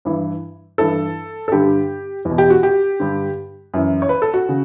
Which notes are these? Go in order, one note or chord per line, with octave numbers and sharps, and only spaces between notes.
G2 E3
G2 E3 A4
A4
G2 D3 G4
E2 B2
G4
F#4
G4
G2 D3
F#2 E3
C#5
B4
A4
F#4
C#3